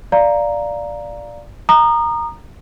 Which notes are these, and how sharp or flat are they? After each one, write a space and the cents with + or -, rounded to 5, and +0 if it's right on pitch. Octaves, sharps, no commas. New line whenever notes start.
D5 +0 F5 +0 A#5 +0
A#5 +0 D#6 -30